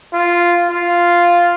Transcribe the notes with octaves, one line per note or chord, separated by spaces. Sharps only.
F4
F4